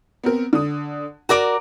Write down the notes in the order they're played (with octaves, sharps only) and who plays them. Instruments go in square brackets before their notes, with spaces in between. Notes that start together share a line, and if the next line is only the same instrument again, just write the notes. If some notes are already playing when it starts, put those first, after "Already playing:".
[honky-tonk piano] B3 C4 A#4
D3 D#6
[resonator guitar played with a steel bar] F#4 A#4 D5 [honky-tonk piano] A#5 D6 D7